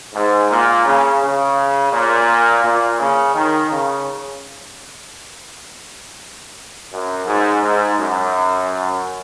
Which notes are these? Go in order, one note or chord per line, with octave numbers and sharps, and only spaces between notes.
G#2
A#2
C#3
C#3
A#2
A#2
C#3
D#3
C#3
F#2
G#2
G#2
F#2